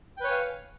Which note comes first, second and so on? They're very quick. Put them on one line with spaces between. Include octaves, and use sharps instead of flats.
G5 B4 C#5 G#5 F5